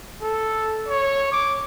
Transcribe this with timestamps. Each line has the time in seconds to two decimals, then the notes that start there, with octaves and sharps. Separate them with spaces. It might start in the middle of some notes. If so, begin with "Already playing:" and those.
0.22 A4
0.88 C#5
1.32 D6